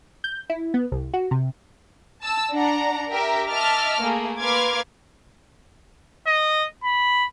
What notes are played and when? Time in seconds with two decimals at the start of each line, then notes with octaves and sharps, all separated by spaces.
0.24 G6
0.50 E4
0.74 B3
0.92 C2
1.14 F#4
1.31 C3
2.21 A5 E6
2.53 D4 F#5 A#5
3.11 G4 A#4 E5
3.50 D#5 E5 A5 D6 F6
4.01 A3 A#3 G#4
4.39 A#3 B4 C6 D6 F6 G#6
6.27 D#5
6.84 B5